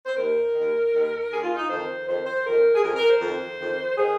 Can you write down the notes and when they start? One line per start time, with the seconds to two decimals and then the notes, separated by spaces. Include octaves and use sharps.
0.06 C5
0.15 D#2 D#3 A#4
0.54 D#2 D#3
0.93 D#2 D#3
1.30 D#2 D#3 G#4
1.43 F4
1.56 D#4
1.68 F2 D#3 C5
2.07 F2 D#3 C5
2.25 C5
2.44 F2 D#3 A#4
2.74 G#4
2.83 F2 D#3 A#4
2.96 A#4
3.08 C5
3.21 F2 D#3
3.59 F2 D#3
3.97 D#3 G#4